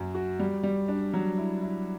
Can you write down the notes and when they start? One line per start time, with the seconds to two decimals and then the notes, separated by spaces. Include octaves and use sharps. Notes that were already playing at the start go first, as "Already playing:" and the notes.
Already playing: F#2 F#3
0.15 F#4
0.39 G3
0.63 G3
0.88 D4
1.14 F#3
1.38 E4
1.62 E4